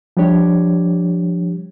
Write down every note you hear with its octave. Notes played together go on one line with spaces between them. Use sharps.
F3 G3 D4 G4 C#5